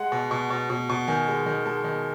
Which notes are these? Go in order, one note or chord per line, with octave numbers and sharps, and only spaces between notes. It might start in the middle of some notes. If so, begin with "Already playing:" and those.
Already playing: G#3 F#5
B2
B2
B2
B2
B2
D#3 G#5
G#3
D#3
G#3 A5
D#3